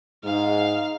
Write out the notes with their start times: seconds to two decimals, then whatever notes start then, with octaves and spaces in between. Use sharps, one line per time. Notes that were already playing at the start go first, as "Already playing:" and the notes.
0.24 G#2 D#4 F5